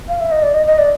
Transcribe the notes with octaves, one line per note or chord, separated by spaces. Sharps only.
F5
E5
D#5
D5
D#5
D#5
D5